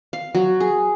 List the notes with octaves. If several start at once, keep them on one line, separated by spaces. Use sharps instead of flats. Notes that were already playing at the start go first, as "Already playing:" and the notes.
F5
F#3
G#4